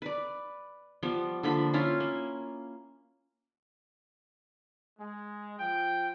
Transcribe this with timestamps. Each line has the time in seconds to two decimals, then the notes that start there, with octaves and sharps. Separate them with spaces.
0.02 B4 D5
1.03 F3 G3 B3
1.43 D3 F3 A#3 B5
1.74 C#4 E4 F4 F5
2.00 A#3
4.99 G#3
5.59 F3 G5